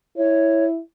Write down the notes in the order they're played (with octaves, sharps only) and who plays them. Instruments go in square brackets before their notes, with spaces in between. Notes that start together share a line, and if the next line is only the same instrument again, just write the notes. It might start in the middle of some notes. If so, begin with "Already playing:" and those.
[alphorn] E4 [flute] C#5